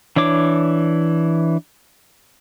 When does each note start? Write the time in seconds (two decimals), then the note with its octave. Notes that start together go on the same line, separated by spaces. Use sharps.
0.16 E3 D4 C#5 D6